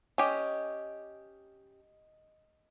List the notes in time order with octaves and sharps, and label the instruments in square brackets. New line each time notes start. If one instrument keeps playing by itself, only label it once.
[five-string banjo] C#4 G4 [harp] D#5